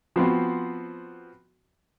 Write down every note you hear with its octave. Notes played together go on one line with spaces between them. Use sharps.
F3 B3 C4 F#4